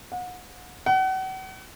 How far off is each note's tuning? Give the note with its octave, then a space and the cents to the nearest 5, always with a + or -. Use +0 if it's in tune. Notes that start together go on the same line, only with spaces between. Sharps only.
F#5 -35
F#5 +35